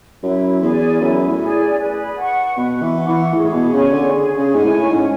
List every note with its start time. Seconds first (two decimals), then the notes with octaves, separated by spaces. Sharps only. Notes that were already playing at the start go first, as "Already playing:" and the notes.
0.23 F#2 E4
0.62 E2 G#4 D5 G#5
1.00 F#2 E4
1.27 A2
1.40 G#4 D5 G#5
1.78 B4
2.17 F#5 C#6
2.56 B2 B4
2.82 E3
2.95 F#5 C#6
3.08 E3
3.34 A2 G#4
3.44 A2
3.53 B2
3.72 C#3 C#5 G#5 C#6
3.93 D3
4.12 G#4
4.38 C#3
4.51 G#2 C#5 G#5 C#6
4.64 A2
4.89 G#2 C#4